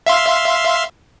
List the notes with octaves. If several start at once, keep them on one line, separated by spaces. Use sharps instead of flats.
E5 F5 C6